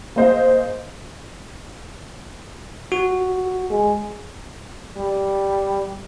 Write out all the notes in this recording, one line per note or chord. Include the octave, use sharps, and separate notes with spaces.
A#3 C4 G#4 C5 D#5 F5
F#4
G#3
G3